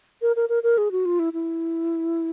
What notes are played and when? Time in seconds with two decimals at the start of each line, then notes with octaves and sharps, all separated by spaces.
0.22 A#4
0.36 A#4
0.49 A#4
0.63 A#4
0.78 G#4
0.91 F#4
1.05 F4
1.19 E4
1.33 E4